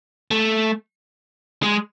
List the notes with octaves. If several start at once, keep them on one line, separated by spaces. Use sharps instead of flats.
A3
G#3